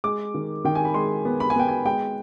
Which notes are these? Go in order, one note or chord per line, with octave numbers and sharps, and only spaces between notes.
G#3 D6
D#3
D#3 G5
G#5
B5
G#3 C6
B3
B5
G#5
B3 G5
G#5
G#3 G5